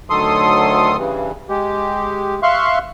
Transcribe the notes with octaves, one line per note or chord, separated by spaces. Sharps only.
D2 D#3 F#3 A4 C6 D#6
G2 C#3 E3 G3
G#3 G4
E5 F5 C6 C#6 F#6